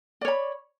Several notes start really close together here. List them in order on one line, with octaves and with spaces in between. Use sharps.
D5 C#5 B5